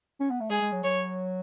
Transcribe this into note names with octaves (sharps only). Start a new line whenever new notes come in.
C#4
B3
A3
G#3 G#4
G#3
F#3
F#3 C#5